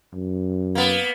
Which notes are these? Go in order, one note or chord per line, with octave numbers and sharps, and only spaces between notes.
F#2
A#3 B3